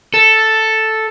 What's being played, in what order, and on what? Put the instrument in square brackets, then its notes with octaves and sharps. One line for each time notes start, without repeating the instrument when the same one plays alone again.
[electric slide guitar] A4